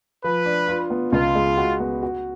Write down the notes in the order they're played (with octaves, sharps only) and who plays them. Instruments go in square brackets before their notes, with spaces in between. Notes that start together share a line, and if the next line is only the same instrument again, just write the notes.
[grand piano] F3 [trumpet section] B4
[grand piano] D4
F4
B3
[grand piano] C#2 [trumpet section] F4
[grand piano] G#3
F#4
B3
F#4